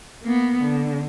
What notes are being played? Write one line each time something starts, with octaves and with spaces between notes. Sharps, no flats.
A#3 B3
D3